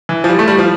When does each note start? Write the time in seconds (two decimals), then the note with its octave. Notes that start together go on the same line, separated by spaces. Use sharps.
0.09 E3
0.24 F3
0.29 G3
0.39 A3
0.48 G3
0.58 F3